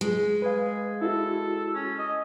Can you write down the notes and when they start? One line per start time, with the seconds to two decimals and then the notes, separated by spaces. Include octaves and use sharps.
0.01 G#3
0.42 G#4 B4 F5
1.02 E4 F#4 A4
1.75 C#4
1.99 D#5